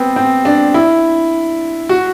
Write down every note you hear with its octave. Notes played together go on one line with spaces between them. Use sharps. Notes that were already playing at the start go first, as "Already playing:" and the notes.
Already playing: B3 C4
C4
D4
E4
F#4